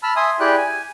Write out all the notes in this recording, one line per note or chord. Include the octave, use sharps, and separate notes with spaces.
A5 B5 E6 F6
E5 G#5 C6 D#6
E4 G4 G#4 D5 G5 F#6
G#5